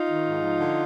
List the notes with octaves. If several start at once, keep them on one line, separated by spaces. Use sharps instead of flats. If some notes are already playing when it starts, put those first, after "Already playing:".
Already playing: D#4 F4
D#3
G#2
F3
D3